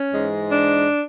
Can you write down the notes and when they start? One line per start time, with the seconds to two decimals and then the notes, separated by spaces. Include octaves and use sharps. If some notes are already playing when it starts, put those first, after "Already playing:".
Already playing: C#4
0.13 G#2 E3 G#3
0.51 D4